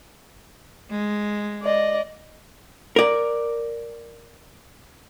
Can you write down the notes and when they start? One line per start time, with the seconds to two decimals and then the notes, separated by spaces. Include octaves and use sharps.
0.91 G#3
1.62 D5 D#5
2.96 A#4 D5